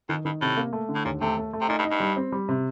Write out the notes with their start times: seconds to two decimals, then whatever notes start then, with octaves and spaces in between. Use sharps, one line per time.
0.09 F2 D#3
0.25 G2 D#3
0.42 A2 C3
0.57 A#3
0.73 A3
0.89 D3
0.95 A2
1.05 D#2 A#2
1.21 C3 A3
1.37 A3
1.53 A3
1.61 C3
1.68 A#2 D#4
1.79 G2
1.85 D#4
1.91 G2
2.00 G3
2.16 C4
2.32 G3
2.49 C3